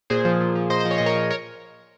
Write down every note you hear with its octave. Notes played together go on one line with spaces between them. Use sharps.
A#2 G#4 C5
F3
A#2
F3
A#2 C5 D#5
C5 D#5
F3
C#5
A#2 D#5
A#4 C#5
F3
A#4 C#5